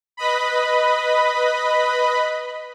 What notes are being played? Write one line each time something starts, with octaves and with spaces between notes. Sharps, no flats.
B4 D#5 B5